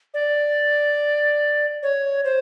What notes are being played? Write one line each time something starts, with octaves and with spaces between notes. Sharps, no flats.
D5
C#5
C5